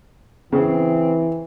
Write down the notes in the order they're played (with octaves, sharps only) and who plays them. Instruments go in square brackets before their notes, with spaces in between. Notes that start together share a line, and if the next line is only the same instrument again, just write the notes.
[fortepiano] C#3 [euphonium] E3 [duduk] C4